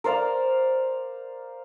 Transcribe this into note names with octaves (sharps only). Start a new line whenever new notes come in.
A#4 C5 D5 F5